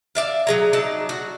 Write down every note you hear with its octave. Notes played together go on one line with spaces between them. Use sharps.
D5 E5 F5
F#3 G#4 A#5
F#3 D#4 D5 A5
F#4